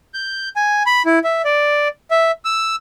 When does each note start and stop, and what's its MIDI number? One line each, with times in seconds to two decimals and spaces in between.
0.14 0.49 91
0.56 0.83 80
0.86 1.02 83
1.06 1.19 64
1.24 1.42 76
1.45 1.88 74
2.11 2.31 76
2.45 2.76 88